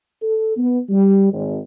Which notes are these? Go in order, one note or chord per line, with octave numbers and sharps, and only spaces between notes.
A4
B3
G3
G#1